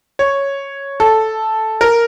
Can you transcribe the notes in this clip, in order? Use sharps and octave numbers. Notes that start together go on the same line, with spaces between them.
C#5
A4
A#4